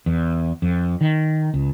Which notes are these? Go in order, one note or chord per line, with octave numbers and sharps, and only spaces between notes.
E2
F2
D#3
C#2